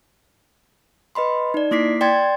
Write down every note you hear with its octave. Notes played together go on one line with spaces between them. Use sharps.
B4 D#5 B5 C6
D#4 D5
A#3 E4 D6 B6 C7
D5 G5 C6 G#6 A6